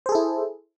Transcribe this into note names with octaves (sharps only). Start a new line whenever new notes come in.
E4 G#4 A4 C5